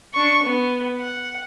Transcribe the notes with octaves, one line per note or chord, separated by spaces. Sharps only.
D4 C#6
B3
F#5